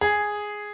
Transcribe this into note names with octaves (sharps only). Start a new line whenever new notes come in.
G#4